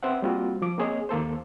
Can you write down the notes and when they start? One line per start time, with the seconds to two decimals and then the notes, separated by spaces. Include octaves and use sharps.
0.03 C4 B4 C5 E5 F#5
0.22 G3 A#3 C4 F4 F#4
0.62 F3 D6
0.78 A#3 C4 G#4 C#5 D#5
1.09 D#2 A#3 A4 C5